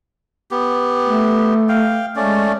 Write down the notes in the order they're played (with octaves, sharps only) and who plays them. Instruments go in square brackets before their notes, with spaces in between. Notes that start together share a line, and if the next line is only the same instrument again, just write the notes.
[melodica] B3 G4
[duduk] A3
[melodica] F5 G5
[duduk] G#3 [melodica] A3 C#4 D5